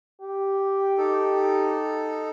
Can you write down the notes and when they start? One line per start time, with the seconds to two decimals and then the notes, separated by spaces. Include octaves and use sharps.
0.21 G4
0.98 D#4 A4